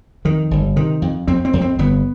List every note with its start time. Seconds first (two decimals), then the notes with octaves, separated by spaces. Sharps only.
0.25 F2 D#3
0.51 G1
0.76 C3 D#3
1.02 F2
1.28 F2 C4
1.45 C4
1.53 F2
1.61 C4
1.79 G1 B3